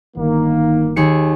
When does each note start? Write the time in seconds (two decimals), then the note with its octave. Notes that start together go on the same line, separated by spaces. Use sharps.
0.17 G1 D#3 A#3
0.96 D#2 G#4 C#7